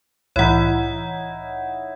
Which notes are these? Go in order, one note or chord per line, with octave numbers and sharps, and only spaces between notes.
C2 A2 E3 D#4 E4 C#5 F#5